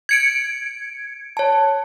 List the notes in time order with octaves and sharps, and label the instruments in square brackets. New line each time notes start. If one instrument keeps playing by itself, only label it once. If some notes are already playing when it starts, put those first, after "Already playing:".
[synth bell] G#6 C#7 D7
[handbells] C#5 A5